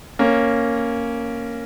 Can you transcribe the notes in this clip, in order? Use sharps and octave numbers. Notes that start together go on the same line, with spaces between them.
A#3 C#4